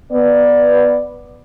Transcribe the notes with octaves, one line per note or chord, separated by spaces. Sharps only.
B3 D5